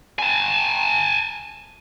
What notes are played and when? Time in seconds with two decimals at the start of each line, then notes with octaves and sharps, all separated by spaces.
0.19 G#5 A5